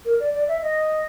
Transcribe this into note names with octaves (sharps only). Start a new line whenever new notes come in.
A#4
D5
D5
E5
D#5